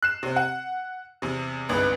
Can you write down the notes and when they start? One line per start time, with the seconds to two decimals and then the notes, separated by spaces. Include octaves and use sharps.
0.03 F#6 C7 E7
0.23 C3 C4
0.36 F#5
1.22 E2 C3
1.69 G1 C2 G#2 B4